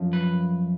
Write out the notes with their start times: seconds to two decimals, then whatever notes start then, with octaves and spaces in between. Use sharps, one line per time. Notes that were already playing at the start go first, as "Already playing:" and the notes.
Already playing: F#2 F3
0.13 B4